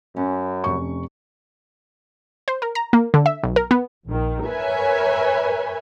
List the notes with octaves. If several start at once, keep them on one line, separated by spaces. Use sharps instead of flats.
F#2 C#4
F1 C#6
C5
A#4
A#5
A#3
D3
E5
B1
A#4
B3
A#1 D#3
A#4 B4 C#5 E5 G#5